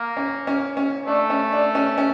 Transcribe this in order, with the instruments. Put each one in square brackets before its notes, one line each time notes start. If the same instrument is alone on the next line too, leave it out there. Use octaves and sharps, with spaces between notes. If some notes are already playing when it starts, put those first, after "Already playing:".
Already playing: [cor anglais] A#3
[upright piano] C#4
C#4
C#4
[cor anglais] A3 [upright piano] D4
[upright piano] C#4
D4
C#4
C#4